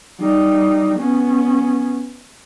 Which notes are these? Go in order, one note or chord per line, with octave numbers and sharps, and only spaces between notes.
G3 D#4
B3 C#4